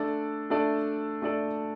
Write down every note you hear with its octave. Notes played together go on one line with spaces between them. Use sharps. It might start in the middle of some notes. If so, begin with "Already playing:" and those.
Already playing: A3 D4 A4 D5
A3 D4 A4 D5
A3 D4 A4 D5